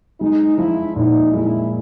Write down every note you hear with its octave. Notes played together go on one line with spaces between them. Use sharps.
G#3 D#4
F3 E4
A#2 D#4
G#3 E4